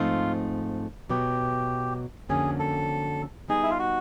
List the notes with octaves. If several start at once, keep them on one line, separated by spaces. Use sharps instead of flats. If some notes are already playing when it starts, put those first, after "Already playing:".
Already playing: G#2 F3 A3 C4 D#4 F4
B2 F#3 B3 G4
F2 D3 F#3 A#3 C#4 G#4
A4
G3 B3 D#4 G#4
E4
F4
F#4